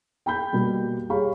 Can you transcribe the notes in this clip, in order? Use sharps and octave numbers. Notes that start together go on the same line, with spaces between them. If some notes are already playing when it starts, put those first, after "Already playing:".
G5 B5 G6
B2 G3 A#3
G4 G#4 C#5 F5 B5 C#6